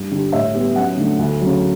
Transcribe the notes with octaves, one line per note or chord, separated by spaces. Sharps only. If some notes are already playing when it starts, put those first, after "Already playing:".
Already playing: G2
D3 G3
A2 E5
G3 B3
F#2 F#5
D3 A3
D2
C#3 F#3